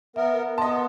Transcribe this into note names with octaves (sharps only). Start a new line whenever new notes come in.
B3 A#4 E5
B3 D#5 A5 C6